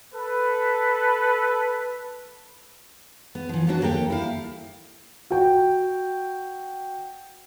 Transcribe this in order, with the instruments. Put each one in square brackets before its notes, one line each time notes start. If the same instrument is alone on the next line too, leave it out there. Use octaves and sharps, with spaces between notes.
[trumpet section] A4 B4
[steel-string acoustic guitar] B3
E3 F3
F#3 B3 C4 D4 F#4
D#2 A#3 G4 A4 G5
E4 F5
[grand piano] F#4 G5